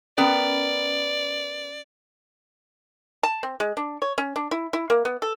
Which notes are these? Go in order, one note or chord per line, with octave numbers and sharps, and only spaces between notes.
B3 C#4 A#4 D5
A5
C4
G#3
D4
C#5
C#4
D4
E4
E4
A#3
B3
A4